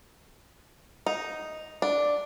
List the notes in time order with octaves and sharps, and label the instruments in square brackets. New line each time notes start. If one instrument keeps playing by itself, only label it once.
[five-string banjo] D#4
D4